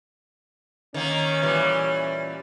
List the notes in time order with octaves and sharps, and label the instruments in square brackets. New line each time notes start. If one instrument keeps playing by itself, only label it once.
[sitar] D#3 A#3 [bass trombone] C#4
[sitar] A#2 E3 G3